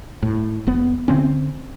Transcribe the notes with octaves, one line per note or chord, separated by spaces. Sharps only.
A2
F1 B3
D3 C4 C#4